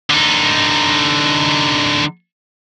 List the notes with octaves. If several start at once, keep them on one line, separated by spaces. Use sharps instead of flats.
D3 D#4